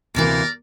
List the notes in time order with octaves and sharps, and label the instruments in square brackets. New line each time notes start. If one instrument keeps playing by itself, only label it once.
[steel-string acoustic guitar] D2 C3 E3 A#3 [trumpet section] A#4 D5